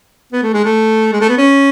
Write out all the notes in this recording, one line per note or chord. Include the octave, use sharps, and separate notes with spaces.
B3
A3
G#3
A3
G#3
A3
B3
C#4